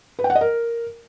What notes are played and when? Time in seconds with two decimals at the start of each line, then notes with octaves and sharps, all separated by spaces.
0.19 B4
0.24 G5
0.30 F#5
0.35 D#5
0.41 A#4